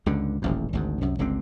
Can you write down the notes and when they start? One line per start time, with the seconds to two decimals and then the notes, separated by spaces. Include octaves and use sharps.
0.06 C#2 G2 D3
0.42 D#1 A1 F#2
0.73 G#1 D2 G#2
1.01 C2 F#2
1.19 G1 C#2 D3 C4